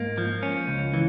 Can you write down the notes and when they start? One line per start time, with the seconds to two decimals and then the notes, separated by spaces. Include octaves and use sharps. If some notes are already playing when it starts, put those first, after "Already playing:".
Already playing: G#2 A#3
0.18 F3
0.43 C#4
0.68 C#2
0.94 E3